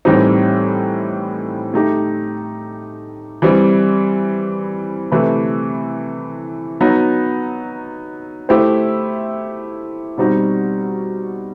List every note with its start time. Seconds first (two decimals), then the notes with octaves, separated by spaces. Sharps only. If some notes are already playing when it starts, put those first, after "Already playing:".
0.05 A2 E3 G3 C4 D#4
1.74 A3 D#4 G4
3.42 E3 G3 C4
5.11 C3 E3 A3 E4 B4
6.80 F#3 B3 D#4
8.49 A3 E4 G4 C5
10.18 B2 G3 C4 D#4 F#4